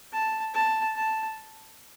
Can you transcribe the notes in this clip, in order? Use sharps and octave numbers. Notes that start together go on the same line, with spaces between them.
A5
A5
A5